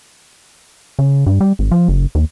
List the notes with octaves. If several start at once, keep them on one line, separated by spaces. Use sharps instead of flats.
C#3
G2
G3
G#1
F3
F#1
D#2